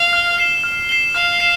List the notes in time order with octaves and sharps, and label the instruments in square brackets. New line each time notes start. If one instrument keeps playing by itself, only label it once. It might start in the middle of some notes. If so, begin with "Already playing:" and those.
Already playing: [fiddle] F5
[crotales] F6
C7 E7 G7
F6
C7 E7 G7
[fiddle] F5 [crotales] F6
[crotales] C7 E7